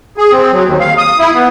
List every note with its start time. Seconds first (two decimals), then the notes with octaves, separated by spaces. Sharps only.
0.17 G#4
0.32 C4
0.52 F#3
0.65 D#2
0.80 F5
0.98 D#6
1.19 E4
1.35 B3